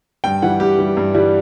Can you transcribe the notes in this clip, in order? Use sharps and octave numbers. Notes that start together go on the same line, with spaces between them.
G2 G5
E3 G3 F#5
G2 G4
E3 G3
G2
E3 G3